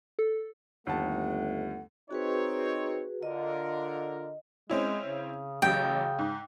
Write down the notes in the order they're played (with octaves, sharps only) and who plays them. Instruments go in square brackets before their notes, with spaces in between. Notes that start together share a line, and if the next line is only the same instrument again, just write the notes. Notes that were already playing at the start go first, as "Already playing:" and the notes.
[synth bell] A4
[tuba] G1 [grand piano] D#2 A5 [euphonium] A3 [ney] F#5
[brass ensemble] C4 D#4 C#5 [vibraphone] F#4 G#4 B4
[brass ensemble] D3 F4 A#4 [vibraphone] D#5
[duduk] G#3 [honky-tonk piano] C4 C#4 E4
[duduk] C#3
[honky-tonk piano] A1 F#3 G4 [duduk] C#3 [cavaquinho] G5
[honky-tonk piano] G#2